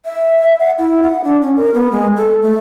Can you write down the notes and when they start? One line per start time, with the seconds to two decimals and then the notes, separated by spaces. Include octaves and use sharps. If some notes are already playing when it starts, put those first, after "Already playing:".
0.05 E5
0.60 F#5
0.78 E4
1.03 F#5
1.24 D4
1.42 C#4
1.57 A#4
1.74 B3
1.92 G#3
2.17 A4
2.42 A3